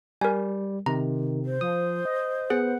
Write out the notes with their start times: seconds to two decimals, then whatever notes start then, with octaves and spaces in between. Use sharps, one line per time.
0.21 G3 A#4 G#5
0.86 C3 D#3 A#5
1.45 C5
1.61 F3 D#6
2.05 D#5
2.50 B3 G#4 F#5